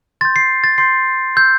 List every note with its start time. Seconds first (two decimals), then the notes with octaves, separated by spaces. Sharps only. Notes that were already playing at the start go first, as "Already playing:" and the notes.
0.21 C6 G6 A6
0.36 C7
0.64 A6
0.78 C6 G6 C7
1.36 C6 E6 G6